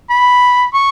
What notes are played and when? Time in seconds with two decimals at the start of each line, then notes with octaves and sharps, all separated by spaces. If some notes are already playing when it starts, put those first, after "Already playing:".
0.10 B5
0.73 C#6